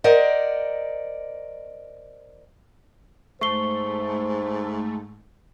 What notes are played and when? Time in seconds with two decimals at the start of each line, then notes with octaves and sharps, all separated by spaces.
0.04 A#4 C5 D5 D#5 F#5
3.41 G#2 A3 C5 C#6 C7 G7